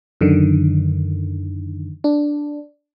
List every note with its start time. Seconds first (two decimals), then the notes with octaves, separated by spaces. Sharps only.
0.21 F#2 D3 D#3
2.04 D4